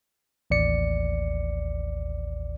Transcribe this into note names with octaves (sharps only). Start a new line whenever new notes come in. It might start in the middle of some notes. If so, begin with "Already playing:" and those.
A1 D#2 D5 C#7